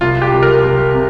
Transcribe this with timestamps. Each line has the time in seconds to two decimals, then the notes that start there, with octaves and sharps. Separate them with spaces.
0.01 C2 F4
0.22 G4
0.32 C2
0.43 A#4
0.63 C2
0.94 C3